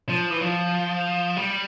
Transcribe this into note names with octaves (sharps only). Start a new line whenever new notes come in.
F3
E3
F3
G3